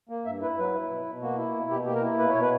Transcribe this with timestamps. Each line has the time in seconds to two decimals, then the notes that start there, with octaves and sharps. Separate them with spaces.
0.09 A#3
0.25 G2 E5
0.42 E4 B4
0.58 F#3 B4
0.74 E4
0.90 B2
1.06 B2
1.22 A#3 F#4
1.38 E4
1.54 B2
1.71 B2 G4
1.86 A#3 G4
1.95 A#4
2.03 E4
2.19 B2 B4
2.30 C#5
2.35 B2
2.42 B4